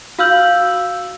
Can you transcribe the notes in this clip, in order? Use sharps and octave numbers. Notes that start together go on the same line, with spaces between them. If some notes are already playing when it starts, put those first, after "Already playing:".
F#4 F5 E6 F6 G6 F#7